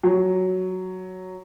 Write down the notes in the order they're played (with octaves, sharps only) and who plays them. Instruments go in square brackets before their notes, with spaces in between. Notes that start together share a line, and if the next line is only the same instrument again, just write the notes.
[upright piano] F#3